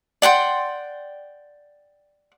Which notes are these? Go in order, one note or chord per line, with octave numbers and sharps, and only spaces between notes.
D5 F#5 G5 C6